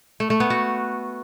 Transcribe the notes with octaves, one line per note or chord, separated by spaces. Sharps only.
A3
A3
B3
F#4